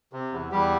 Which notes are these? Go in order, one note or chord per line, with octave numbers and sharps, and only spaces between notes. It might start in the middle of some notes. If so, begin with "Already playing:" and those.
C3
E2
E2 G3 G4